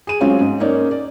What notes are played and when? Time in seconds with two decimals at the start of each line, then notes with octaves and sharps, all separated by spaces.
0.07 G#4 D#7
0.20 F#3 G#3 C4 C#4 F4 C#5
0.41 G#2
0.60 A#3 C#4 D#4 C#5 D5
0.91 D5